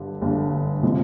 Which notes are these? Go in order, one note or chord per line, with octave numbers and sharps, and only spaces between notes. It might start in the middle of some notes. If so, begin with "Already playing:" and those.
Already playing: G1 G2 D3
G1 G2 D3
C3 F3 G#3